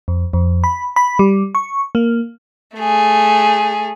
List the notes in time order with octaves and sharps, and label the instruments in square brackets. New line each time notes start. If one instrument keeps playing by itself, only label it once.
[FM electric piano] F2
F2
B5
B5
G3
C#6
A#3
[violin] A3 G#4